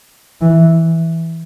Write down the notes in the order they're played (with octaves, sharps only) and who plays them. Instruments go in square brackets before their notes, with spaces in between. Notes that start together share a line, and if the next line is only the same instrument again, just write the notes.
[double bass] E3